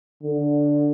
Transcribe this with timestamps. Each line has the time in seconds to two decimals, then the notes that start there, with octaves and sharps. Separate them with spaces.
0.23 D3